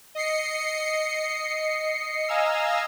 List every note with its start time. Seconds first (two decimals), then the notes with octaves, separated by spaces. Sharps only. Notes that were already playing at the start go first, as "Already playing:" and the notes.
0.15 D#5 C7 C#7
2.28 D#5 F5 G#5 A#5 E6